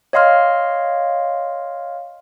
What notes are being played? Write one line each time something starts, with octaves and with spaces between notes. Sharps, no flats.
C#5 D#5 F5 C6 F6